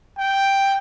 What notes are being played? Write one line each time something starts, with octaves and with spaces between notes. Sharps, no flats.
G5